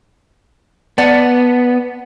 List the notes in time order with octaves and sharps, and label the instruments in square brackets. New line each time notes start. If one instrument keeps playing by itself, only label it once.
[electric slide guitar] B3 [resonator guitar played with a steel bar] D5 F#5 A5